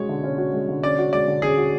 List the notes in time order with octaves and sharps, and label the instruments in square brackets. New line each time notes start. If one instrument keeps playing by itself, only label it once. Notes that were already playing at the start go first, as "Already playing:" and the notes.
Already playing: [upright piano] G#3 C#4 F#4 [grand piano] C#5
[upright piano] D3
C#4
F#4
G#3
D3
[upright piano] C#4 [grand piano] D5
[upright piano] F#4
[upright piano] G#3 [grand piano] D5
[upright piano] D3
[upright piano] C#4 [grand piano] G#4
[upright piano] F#4